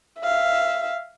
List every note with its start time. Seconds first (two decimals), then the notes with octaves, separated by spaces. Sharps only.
0.20 E5 F5